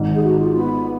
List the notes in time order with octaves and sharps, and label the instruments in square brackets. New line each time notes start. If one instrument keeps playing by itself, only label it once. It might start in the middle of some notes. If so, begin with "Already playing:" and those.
Already playing: [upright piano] G#1 G#2
[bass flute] G#4
F#4
F4
B3